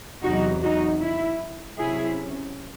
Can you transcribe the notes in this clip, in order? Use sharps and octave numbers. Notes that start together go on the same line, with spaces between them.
E2 C3 F#3 D#4 F#4
D#4 F#4
E4
C3 F#3 C#4 E4 G#4